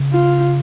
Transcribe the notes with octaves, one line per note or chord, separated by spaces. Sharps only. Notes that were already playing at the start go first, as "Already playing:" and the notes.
Already playing: C#3
F4